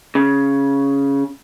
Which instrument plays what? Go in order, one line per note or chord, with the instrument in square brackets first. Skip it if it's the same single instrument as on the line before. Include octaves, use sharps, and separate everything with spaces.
[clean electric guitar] C#3